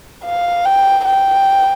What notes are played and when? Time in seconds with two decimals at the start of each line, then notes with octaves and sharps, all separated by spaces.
0.25 F5
0.65 G5
1.05 G5